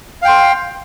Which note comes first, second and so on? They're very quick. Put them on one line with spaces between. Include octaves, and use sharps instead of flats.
F5 G5 C6